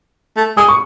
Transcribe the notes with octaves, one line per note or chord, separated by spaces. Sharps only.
A3
G#3 D#6
C#6